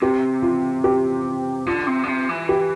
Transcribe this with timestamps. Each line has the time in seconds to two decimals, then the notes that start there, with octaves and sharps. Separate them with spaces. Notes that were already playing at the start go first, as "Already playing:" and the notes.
0.02 C3 G4
0.42 F4
0.84 G4
1.66 D3 F4
1.87 C3
2.04 D3
2.08 C3
2.29 E3
2.49 G4